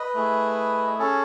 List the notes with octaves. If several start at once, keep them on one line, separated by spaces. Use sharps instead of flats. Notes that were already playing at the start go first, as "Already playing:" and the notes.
Already playing: B4 D#5
A3 E4 G#4
C#4 G#4 A4 C#5